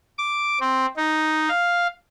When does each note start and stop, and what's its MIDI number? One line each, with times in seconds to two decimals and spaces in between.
0.18 0.59 86
0.60 0.86 60
0.97 1.49 63
1.49 1.87 77